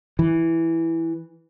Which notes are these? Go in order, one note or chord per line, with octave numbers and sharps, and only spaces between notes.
E3